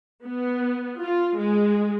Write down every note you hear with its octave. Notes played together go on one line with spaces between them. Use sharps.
B3
F4
G#3